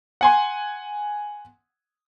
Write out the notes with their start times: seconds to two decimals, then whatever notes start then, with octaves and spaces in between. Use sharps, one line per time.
0.21 F#5 G#5 C6